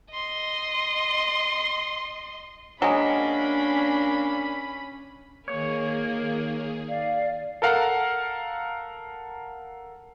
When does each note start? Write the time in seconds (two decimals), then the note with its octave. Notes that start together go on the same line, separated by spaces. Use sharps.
0.13 D#5 C6
2.82 F#3 G#3 A#3 C#4 D4 B5
5.48 D#3 A#3 G#4 C#5
6.89 D5 F5
7.62 A4 A#4 F5 F#5 A5 A#5